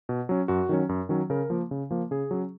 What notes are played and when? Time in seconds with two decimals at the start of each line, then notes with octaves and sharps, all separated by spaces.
0.09 B2
0.29 F#3 C#4
0.48 F#2 F#4
0.69 D#3 F#3 C#4
0.89 F#2
1.09 D#3 F#3 C#4
1.30 C#3 A#4
1.50 F3 A#3
1.71 C#3
1.91 F3 A#3
2.11 C#3 G#4
2.31 F#3 C#4